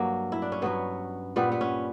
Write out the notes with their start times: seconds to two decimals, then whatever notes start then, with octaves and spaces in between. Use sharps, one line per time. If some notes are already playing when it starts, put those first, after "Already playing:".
Already playing: G2 F#3 A#3
0.32 E4
0.42 D4
0.52 C#4
0.62 G2 F#3 B3
1.36 A#2 G3 B3
1.52 B3
1.61 C#4